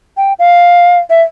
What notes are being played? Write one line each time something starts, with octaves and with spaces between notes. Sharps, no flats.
G5
F5
E5